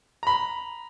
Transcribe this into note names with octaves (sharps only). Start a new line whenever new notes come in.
A#5 B5